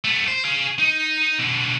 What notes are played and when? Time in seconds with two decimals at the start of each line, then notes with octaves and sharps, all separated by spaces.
0.04 A3 B3
0.28 C5
0.45 G#4 F5
0.79 D#4
1.39 B2 D3